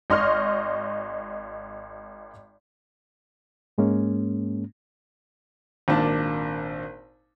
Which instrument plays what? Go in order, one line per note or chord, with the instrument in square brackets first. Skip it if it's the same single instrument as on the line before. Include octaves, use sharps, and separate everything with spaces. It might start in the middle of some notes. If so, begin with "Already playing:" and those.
[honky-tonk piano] G#1 D#5 C6 C#6 F6
[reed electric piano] G#2 G#3 A#3 C#4
[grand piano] G#1 A#2 A#3 D4 A5